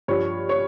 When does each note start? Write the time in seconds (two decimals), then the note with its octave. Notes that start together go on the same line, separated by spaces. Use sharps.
0.08 G2 F3 C#5
0.49 C#5